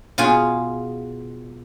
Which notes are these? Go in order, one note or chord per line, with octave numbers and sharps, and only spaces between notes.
B2 F4 G#4 G#5